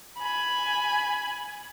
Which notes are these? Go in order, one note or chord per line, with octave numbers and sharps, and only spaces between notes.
G#5 B5